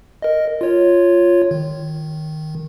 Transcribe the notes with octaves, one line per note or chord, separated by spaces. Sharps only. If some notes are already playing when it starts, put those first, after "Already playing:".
A#4 D#5
F4 C#5
D#3